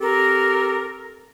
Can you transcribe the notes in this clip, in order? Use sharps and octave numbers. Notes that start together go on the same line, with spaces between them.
C4 G4 A4 A#4